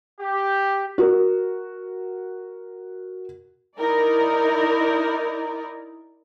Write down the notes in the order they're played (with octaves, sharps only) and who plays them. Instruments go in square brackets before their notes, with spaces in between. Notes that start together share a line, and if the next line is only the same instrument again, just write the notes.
[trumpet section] G4
[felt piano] F#4 A#4
[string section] D#4 E4 A#4 D5